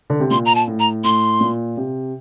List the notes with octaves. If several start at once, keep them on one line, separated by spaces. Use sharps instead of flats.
D3
C3
A#2 C6
A#5
A5
A2
A#5
A2 C6
A#2
C3